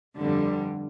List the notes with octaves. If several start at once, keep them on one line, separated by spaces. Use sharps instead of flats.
G1 F2 D3 G3